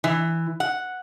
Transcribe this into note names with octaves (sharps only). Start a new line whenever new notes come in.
E3
F#5